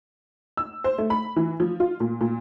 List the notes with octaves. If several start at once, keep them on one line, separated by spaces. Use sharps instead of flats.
E6
C5
A3
B5
E3
F3
F4
A#2
A#2